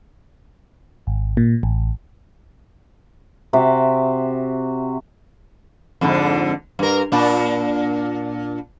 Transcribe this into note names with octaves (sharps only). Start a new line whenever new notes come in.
G#1
A#2
A1
C3 F#4 E5 D6
F2 G#2 D3
G2 A#4
A#2 D4